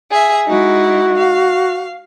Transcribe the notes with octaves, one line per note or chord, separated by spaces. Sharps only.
G#4 E5
G#3 D#4 E4 F#4
F5